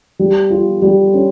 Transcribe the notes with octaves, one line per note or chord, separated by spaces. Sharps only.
G3
F4
G3
C#4